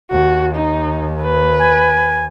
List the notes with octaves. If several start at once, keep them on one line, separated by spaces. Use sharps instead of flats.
D#2 F#4
D#4
B4
G#5